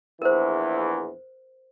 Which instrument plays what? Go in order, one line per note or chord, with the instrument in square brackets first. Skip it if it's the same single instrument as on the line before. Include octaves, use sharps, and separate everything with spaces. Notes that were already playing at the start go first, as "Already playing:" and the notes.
[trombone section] A#1 E2 E3 [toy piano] A#4 C5